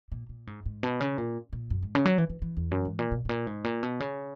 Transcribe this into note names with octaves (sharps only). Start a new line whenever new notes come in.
A#2
A#2
G#2
G#2
B2
C#3
A#2
A#2
F#2
G#2
C#3
F#3
E3
E3
E3
E2
F#2
G#2
A#2
B2
G#2
A#2
G#2
A#2
B2
C#3